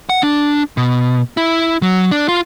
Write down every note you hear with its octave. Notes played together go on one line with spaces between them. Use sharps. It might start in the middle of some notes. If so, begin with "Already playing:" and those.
F#5
D4
B2
E4
F#3
D4
F4